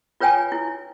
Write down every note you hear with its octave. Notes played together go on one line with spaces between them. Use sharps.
F4 B4 C#5 G5 G#5
E4